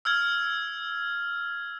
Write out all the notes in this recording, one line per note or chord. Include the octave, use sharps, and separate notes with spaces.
E6 F6 G#6